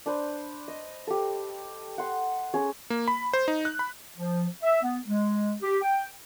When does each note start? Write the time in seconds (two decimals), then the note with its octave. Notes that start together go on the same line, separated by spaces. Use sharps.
0.06 D4 B4 C5
0.68 D#5
1.07 G4 A4
1.98 F#5 C6
2.54 C#4 G#4 C#5
2.90 A#3
3.08 B5
3.33 C5
3.48 D#4
3.65 F#6
3.79 B5
4.17 F3
4.63 E5
4.83 B3
5.07 G#3
5.63 G4
5.82 G5